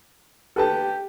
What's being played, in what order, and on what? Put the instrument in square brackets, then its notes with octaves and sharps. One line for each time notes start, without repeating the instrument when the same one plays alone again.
[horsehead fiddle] G4 [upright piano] A4 B4 A5